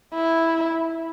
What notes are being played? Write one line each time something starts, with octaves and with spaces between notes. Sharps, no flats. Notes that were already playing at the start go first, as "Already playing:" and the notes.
E4